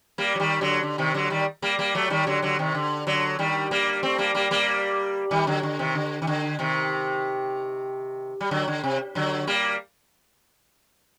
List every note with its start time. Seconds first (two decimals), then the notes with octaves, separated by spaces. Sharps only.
0.18 G3 A#3
0.35 F#3
0.40 D#3 G3
0.61 D3 F#3
0.83 D3
0.98 C3 D#3
1.14 D3 F#3
1.30 D#3 G3
1.62 G3 A#3
1.79 G3 A#3
1.95 F#3 A3
2.10 D#3 G3
2.27 D3 F#3
2.42 D3 F#3
2.59 C3 D#3
2.75 D3
3.07 D3 F#3
3.39 D#3 G3
3.71 G3 A#3
4.03 A3 C4
4.18 G3 A#3
4.35 G3 A#3
4.51 G3 A#3
5.31 D#3 G3
5.47 D3 F#3
5.63 D3
5.79 C3 D#3
5.95 D3
6.22 D#3
6.27 D3
6.59 C3 D#3
8.41 G3
8.51 D3 F#3
8.68 D3
8.84 C3
9.15 D3 F#3
9.47 G3 A#3